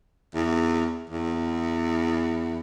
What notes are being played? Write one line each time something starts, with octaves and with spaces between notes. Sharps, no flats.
E2
E2